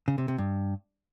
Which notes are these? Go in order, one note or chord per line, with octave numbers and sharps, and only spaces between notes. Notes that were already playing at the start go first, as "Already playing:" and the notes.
C#3
C3
C3
G2